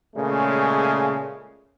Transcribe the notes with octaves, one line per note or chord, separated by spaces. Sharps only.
A#2 C#3 G#3 A3 C#4